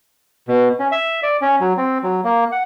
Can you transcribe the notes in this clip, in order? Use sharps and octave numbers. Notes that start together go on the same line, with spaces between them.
B2
C#4
E5
D5
C#4
F#3
C4
F#3
A#3
F#5